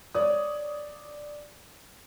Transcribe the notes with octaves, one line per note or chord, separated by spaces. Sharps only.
C#5 D5 D#6